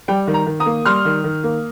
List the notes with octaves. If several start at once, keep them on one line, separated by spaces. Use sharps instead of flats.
G3 G5
D#3
A#5
D#3
A#5 D#6
A#3
G3 C6 F6
D#3
D#3
A#3